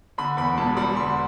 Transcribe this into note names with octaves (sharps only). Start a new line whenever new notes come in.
D3 B5
E2 B5
E1 A5
G3 B5
D3 C6